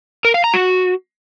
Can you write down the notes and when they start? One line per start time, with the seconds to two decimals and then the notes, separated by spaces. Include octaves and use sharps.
0.25 A#4
0.34 F5
0.44 A#5
0.54 F#4